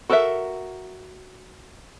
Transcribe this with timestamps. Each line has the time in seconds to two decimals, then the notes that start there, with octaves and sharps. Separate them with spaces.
0.10 F#4 A4 A#4 C#5 E5